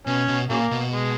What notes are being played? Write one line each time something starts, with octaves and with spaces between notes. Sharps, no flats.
B2 C#4
B2
A#2 C#3 F#3 A#3
B2
G#3